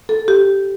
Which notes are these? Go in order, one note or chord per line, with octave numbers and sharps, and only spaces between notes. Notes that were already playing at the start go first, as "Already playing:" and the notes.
A4
G4